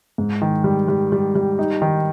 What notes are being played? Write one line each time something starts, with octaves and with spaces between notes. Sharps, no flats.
G#2
D#3
G3
G3
G3
G3
D#4
D#3